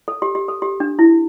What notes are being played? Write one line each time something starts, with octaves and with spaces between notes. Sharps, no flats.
A4
G4
G4
A4
G4
D4
E4